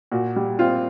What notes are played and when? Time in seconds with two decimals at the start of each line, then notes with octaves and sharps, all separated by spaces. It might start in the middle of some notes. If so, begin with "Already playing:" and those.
0.12 A#2 F#4
0.36 G3
0.59 C4 F4